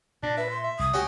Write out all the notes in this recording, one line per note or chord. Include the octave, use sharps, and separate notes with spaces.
A#2 D4
B4 E5
C6
E5
C2 D#6
D2 C#4 F#4 G4